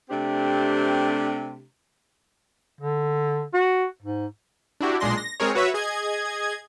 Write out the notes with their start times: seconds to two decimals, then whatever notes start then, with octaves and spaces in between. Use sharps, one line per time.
0.10 C3 A3 C4 D4 G4
2.81 D3
3.54 F#4
4.02 G#2
4.81 D4 E4 F#4 G4
5.00 B1 A#2 G#3 D4 C6 A#6
5.17 A#6
5.40 G#3 C4 G#4 A#4 C#5
5.55 F#4 B4 C#5 E5
5.74 G#4 D#5 G#6